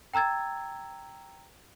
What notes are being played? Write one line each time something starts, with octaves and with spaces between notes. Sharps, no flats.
G5 A#5 E6 G#6 A6